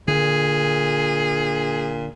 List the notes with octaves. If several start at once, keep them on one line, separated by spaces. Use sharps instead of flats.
A#2 D3 G#4